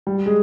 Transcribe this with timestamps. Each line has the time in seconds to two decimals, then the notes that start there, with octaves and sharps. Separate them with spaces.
0.07 G3
0.26 G#3